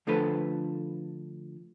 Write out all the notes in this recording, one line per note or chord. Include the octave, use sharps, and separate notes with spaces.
D3 F3 A3 A4 B4